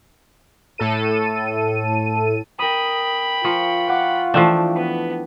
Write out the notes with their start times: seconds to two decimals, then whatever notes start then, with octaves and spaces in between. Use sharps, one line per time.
0.78 A2 A4 D#7
2.59 A#4 G5 B5 D#6
3.44 F3 F4 C#6
3.88 F#5 C#6 D6
4.34 E3 F3 A3 D4 G5 E7
4.76 B3 B4